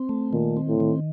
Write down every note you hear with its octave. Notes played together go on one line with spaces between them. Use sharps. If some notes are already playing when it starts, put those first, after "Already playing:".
Already playing: C4
A3
A#2 D#3
C4
A2
D#3